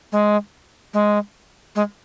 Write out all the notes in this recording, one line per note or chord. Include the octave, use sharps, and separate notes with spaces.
G#3
G#3
G#3